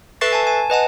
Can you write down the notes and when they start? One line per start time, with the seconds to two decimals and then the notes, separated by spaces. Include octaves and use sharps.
0.21 A4 B4 E5 C#6 A6 C7
0.33 G#5 A5
0.47 G#5
0.70 B4 D#5 F#5 A5